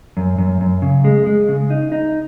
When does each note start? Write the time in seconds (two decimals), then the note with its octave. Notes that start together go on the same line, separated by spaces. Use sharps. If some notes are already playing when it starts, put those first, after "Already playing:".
0.17 F#2
0.38 F#2
0.61 F#2
0.82 C#3
1.04 G#3
1.26 G#3
1.48 C#3
1.70 D#4
1.92 D#4